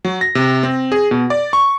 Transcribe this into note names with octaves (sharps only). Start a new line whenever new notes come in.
F#3
A#6
C3
C4
G#4
B2
D5
C#6